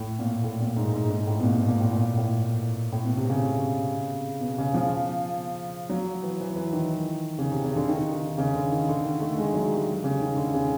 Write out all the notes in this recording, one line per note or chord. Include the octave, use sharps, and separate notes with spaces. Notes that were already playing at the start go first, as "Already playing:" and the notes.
Already playing: A2
A#2
A2
A#2
G#2
G#2
G#2
A2
B2
A#2
B2
A#2
A2
A#2
A2
A2
B2
C3
C#3
B2
C#3
F3
F#3
E3
E3
E3
D#3
C#3
C3
C#3
D3
D#3
D#3
C#3
D3
D#3
D3
D#3
A3
G#3
F#3
G3
C#3
D#3
D3
C#3